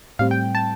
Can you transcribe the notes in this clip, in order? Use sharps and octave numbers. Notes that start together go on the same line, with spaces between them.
A2 G3 C4 F5
G5
A5